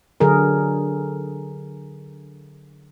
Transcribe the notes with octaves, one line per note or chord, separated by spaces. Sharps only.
D3 F#3 G#4 A#4